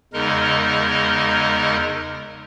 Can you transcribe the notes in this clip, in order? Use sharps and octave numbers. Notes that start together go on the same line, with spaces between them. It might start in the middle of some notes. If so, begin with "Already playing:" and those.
E2 C#3 G#3 D#4 A#4 D#5